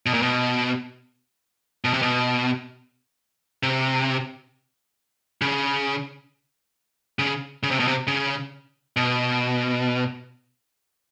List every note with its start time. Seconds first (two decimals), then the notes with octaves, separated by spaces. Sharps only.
0.06 B2
0.14 A#2
0.22 B2
1.84 B2
1.94 C3
2.02 B2
3.63 C3
5.41 C#3
7.19 C#3
7.63 C#3
7.71 C3
7.80 B2
7.88 C3
8.07 C#3
8.97 B2